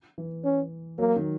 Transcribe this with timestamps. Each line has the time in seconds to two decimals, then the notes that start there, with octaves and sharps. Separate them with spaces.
0.18 E3
0.45 C#4
0.99 F#3 A#3
1.16 D#3